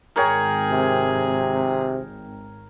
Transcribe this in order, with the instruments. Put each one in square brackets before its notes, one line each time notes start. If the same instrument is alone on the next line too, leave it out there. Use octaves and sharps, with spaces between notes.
[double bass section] G#1 [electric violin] G#4 [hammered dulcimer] A#4 C#5 G5
[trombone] C3